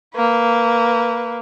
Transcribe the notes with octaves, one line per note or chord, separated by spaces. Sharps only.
A#3 B4